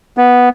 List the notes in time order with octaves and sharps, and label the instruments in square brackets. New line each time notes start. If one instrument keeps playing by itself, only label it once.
[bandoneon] B3